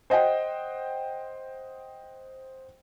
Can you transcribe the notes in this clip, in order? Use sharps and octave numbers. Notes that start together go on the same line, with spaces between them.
C5 D#5 F#5 G5